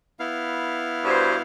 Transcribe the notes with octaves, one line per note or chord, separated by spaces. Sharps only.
B3 E4 F5
G2 F#4 C5